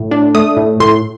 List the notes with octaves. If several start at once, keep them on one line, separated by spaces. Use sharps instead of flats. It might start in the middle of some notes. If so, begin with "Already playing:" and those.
Already playing: A2
D4
A3 D#6
A2
A2 C6